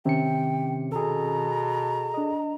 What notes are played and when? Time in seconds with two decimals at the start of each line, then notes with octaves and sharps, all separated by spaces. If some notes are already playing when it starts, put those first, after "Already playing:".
0.05 C3 D#3 C#4 G5 C#7
0.92 B2 G#4 A4 A#5
2.14 D4 D#5